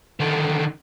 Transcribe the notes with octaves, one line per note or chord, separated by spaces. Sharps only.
D3 D#3